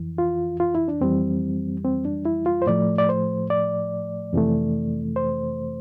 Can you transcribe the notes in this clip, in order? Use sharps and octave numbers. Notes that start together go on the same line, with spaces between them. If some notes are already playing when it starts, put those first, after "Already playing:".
Already playing: F2 E3
F4
F4
E4
D4
F2 E3 G3 C4
C4
D4
E4
F4
C5
A2 F3 A3 D5
D5
C5
D5
F2 C3 E3 A3
C5